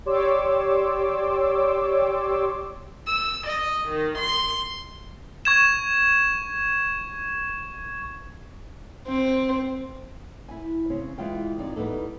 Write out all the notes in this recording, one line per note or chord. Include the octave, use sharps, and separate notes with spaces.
G4 C#5 D5 C6 D6 E6
E6
D#5
D#3
C6
C#6 G#6 E7
C4
E4 G#5
C#3 C4 C#4
E3 G#3 F4 G5
F2 D#4 D5
E3 G3 B3 D#4 A4